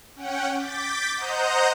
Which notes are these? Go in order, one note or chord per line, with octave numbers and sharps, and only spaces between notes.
C#4 F#5 G5
D6 G6 A6 B6
C5 D#5 F#5 A#5 D#6 G6